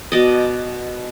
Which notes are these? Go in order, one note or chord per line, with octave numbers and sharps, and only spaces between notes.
B2 D5 D#5